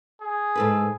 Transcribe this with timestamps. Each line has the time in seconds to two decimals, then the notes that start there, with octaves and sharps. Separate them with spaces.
0.21 G#4
0.55 G#2 A4 B4